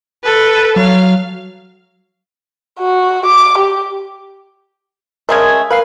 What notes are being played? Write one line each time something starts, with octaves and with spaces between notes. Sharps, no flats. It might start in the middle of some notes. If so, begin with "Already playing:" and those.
A4 B4
F#3 F5
F#4
D6
G4
C#3 G#3 A3 A#4 G#6
A#4 B4 F5 C7